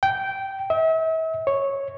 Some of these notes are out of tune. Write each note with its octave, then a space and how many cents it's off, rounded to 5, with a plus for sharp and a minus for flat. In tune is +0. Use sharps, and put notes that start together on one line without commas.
G5 -10
E5 -40
C#5 -5